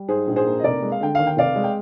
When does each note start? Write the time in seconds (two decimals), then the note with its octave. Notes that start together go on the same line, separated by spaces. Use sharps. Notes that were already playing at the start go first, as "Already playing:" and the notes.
Already playing: G3
0.08 G#2 G#4 C5
0.27 A#1
0.36 G#4 C5
0.45 A#3
0.59 D#5
0.63 F1 A#4 D5
0.82 G#3
0.92 F5
1.00 D3 G5
1.15 D#2 F5
1.27 G5
1.37 F1 D5 F5
1.55 G#3
1.64 G5